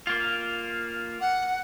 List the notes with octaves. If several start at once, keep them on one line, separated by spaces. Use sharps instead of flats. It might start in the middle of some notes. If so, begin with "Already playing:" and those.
A#3 F4
F#5